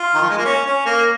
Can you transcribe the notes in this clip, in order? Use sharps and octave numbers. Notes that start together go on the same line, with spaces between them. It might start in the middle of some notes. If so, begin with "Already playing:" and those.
Already playing: F4
D#3
F3
G#3
A#3
C#4
C#4
A#3